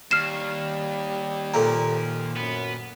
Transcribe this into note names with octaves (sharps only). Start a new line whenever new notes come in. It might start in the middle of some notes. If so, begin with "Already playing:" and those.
D#2 G3 F6 C7 E7
A#2 F3 A#3 A4 A#5
F#2 B3